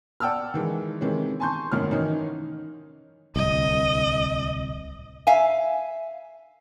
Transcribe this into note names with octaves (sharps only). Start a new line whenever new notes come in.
D5 F#5 G5 A5 E6 F6
D#3 E3 G#3
C3 D#3 E3 G#3 C#4
G#5 A5 C6 C#6 G6
G#1 F#2 A2 D#3 C#4 F6
D#3 E3 C#4 D#4
D1 C2 D#5
E5 F5 G#5